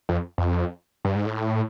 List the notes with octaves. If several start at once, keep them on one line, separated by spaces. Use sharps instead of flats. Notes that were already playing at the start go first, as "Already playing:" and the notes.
F2
F2
G2
G#2
A2